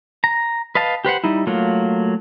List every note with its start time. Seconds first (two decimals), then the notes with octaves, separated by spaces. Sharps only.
0.24 A#5
0.75 B4 D#5 F5 A5
1.05 G4 B4 C5 F#5
1.24 G3 D#4 E4
1.47 F#3 A3 A#3 F4